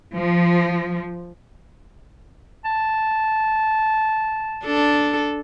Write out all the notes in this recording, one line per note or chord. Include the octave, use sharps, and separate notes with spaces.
F3
A5
D4 A4